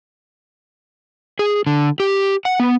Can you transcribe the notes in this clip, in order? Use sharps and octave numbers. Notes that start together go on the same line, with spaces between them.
G#4
D3
G4
F#5
B3